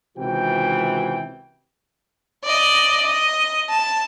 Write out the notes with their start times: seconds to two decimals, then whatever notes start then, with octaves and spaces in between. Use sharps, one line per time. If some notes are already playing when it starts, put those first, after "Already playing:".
0.18 C#2 C3 D#3 E3 F#4 G5
2.44 D5 D#5
3.05 D#5
3.70 A5